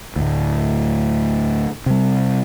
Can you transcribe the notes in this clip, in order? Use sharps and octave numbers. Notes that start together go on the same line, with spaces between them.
D2 A2
C3 G3